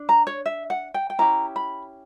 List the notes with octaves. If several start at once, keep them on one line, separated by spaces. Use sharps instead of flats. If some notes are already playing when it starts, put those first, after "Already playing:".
Already playing: D4
A#5
C#5
E5
F#5
G5
G5
C#4 E4 G4 A#5
B5